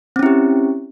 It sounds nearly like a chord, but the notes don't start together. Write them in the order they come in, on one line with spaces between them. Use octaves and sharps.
C4 C#4 E4 G4